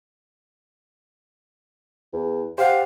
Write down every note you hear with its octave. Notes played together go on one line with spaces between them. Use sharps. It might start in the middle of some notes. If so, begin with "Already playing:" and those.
E2
G4 C5 F5 F#5